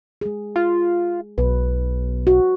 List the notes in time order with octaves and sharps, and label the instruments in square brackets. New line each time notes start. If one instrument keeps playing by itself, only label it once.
[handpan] G#3 G#4
[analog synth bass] F4
[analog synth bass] B1 [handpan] B4
[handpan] F#4